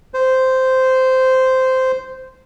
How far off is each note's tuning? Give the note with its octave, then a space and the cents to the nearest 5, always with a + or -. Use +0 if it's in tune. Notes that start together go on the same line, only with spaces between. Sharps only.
C5 -10